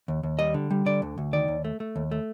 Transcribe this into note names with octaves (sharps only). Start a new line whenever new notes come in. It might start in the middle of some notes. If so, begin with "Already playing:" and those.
D#2
D#2
G3 D#5
D3
G3
D3 D5
D2
D2
D#3 D5
D#2
A3
A3
D#2
A3